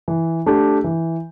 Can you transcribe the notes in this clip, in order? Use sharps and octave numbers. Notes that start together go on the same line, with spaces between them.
E3
A3 D4 G4
E3